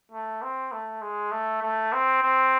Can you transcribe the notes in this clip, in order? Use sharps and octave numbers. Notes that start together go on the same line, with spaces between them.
A3
C4
A3
G#3
A3
A3
C4
C4